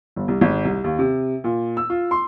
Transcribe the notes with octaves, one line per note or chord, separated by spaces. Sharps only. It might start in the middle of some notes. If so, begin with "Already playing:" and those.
G1
C2
G#1
C2
D#2
C3
A#2
E6
F4
C6